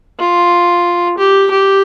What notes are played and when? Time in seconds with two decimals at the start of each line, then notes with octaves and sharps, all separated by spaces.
0.19 F4
1.18 G4
1.51 G4